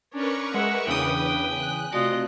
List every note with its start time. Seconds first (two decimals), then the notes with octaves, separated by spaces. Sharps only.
0.13 C#4 D4 A#4 B4 C#6
0.54 G#3 E5 F#5
0.87 E2 C#3 D4 B4 G5 D#6
1.52 G#5 F#6
1.92 C3 A3 F4 F#4 D5 D#5